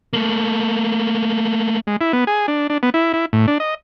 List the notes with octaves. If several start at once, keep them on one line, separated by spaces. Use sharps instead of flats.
A3 A#3
G#3
E4
B3
G#4
D4
D4
B3
E4
E4
A2
D4
D#5